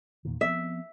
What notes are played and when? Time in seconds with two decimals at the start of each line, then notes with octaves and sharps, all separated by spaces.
0.25 E2 A#2 D#3
0.41 F3 B3 C4 E5